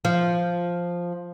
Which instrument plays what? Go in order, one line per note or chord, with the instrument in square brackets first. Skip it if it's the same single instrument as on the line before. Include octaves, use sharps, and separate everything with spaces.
[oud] F3